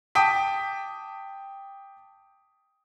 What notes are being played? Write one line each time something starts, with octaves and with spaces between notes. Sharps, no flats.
G5 A5 D6 D#6 B6